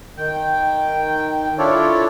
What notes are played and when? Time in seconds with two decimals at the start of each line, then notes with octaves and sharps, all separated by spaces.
0.18 D#3 G5
1.59 D4 E4 F4 A4 C#5 D5